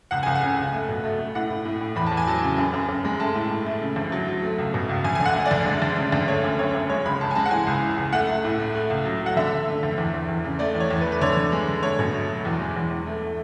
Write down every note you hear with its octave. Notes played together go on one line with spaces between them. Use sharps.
C#2 F#5
C#2 G#5
F#5
C#3
C#2
A3
B2
A3
A3
A2 F#5
A2
A2
A2
E2 B5
A5
E2
G#5
F#3 A5
C#3
F#2
F#2
F#2
G#3
A3 A5
A2
A2
A3
C#3
D2
F#3
F#3
A3
C#2
B2
C#2
D2 G#5
D3 G#5
F#5
A3
D5
D2
G#3
D2
C#3
D2
A3 C#5
F#2
F#2 C#5
F#2
G#3 C#5
C#2 B5
C#2 A5
G#5
G#3 A5
F#5
E3 G#5
C#2
E3
C#2
A3 F#5
A3
A2
A3
A3
C#2
F#3
A3 F#5
D3 E5
D3
A3
D2
E2
E2
E2
C#3
A3 D5
E2
C#5
E2
B4
A3
B4
D3 C#5
D3
G#3
D3
A3 C#5
B2
A3
F#3
E2
G#3
E2
E2
A3
A3